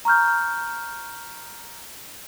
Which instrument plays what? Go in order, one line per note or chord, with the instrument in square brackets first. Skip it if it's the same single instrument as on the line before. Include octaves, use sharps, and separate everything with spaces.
[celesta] A#5 C#6 F6 G6